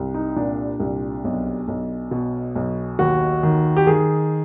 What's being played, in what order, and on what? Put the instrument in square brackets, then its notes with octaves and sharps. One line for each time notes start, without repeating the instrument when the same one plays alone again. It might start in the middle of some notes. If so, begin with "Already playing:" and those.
Already playing: [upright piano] C2
D#4
A#2 D4
C2
B1
B1
B2
B1
D#2 F#4
D#3
G4
D#3 G#4